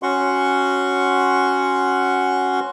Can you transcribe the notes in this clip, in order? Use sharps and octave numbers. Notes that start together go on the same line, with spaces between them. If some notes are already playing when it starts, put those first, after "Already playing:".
C#4 F#4 F#5 C6 C#6